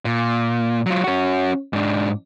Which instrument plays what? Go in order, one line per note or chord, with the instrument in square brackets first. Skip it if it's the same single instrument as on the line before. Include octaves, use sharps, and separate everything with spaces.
[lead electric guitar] A#2
F#3 F4
C#4 F#4
G#2 D4